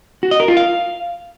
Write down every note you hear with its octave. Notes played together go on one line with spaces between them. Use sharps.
F#4
D#5
A#4
F4
F5